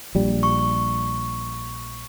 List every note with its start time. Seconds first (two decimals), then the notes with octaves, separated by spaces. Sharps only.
0.15 A#1 G3
0.43 C#6